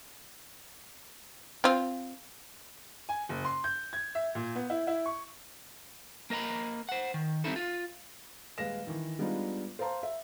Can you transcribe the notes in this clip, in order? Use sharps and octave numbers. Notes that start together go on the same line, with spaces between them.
C4 F4
G#5
F#1
C6
G6
G#6
E5
A#2
B3
E4
E4
C#6
A#3 A#4 D#5 A#5 B5
C5 F#5
D#3
G3 C4 C#4 D#4 E4 A4
F4
D#1 G#3 B4 F5 A#6 E7
D#3 E3
G3 G#3 B3 D4 D#4 F4
C5 F5 A5 A#5 C6
E5